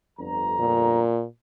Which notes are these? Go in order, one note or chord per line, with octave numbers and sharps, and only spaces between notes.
G1 F2 A#5
A#2